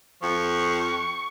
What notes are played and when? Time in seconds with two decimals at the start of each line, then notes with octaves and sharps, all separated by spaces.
0.21 F2 F3 C#6